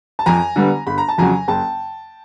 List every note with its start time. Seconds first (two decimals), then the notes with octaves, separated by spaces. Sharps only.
0.19 A5
0.26 F2 G#5 A#5
0.56 D3 G3 B3
0.87 G1 B5
0.98 A#5
1.08 A5
1.18 F2 C#3 F#3 G#5 A#5
1.48 F#1 G5 A5